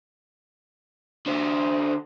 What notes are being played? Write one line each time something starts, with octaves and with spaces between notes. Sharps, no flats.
D3 C5